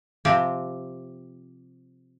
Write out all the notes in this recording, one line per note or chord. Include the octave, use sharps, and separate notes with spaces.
C3 F3 C4 G4